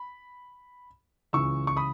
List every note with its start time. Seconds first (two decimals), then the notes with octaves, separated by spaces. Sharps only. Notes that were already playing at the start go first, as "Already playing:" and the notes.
Already playing: B5
1.33 C#2 C#3 E3 C#6 E6
1.67 C#6
1.77 B5 D#6